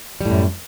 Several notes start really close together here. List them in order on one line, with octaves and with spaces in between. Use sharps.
G3 A2 F#2